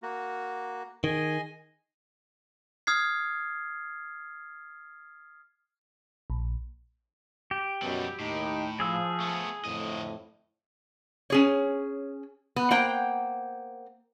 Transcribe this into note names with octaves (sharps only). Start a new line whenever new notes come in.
A#3 F#4
D#3 G#4 D#5 G#5
D#6 F6 G#6 C7
A#1
G4
F#2 B2 F#3 G3
D#2 A2 D#4
F3 G#4 E6
A3 B3
F2 A2 D3 D#5
C#4 G#4 C#5
B3
A#3 C5 F#5 G5 A#5